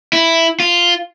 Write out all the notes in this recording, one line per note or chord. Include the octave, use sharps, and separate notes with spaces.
E4
F4